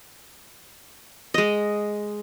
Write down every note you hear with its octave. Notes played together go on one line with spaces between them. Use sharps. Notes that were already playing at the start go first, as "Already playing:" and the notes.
G#3 D#5